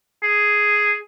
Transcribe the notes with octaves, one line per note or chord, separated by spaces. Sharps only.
G#4